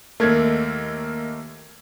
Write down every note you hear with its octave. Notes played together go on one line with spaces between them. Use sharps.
D#2 A3 A#3 A#4 G#6